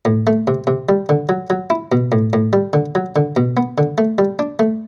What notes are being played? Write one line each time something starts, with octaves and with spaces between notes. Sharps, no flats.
A2
A3
C3
C3
G3
D3
F#3
F#3
E4
B2
A2
A2
G3
D3
F#3
D3
B2
B3
D3
A3
G3
D4
A3